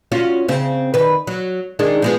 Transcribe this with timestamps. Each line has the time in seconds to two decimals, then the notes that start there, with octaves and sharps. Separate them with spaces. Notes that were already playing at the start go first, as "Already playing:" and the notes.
0.12 C#4 F4 F#4
0.48 C#3 C4
0.94 D#3 B4
1.27 F#3
1.79 D#3 G#3 D4
2.02 F3 G#3 B3